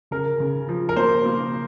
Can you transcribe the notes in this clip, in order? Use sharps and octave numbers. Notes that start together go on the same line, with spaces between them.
C#3 A#4
C#3
F3
A#4
A#3 C5
A#3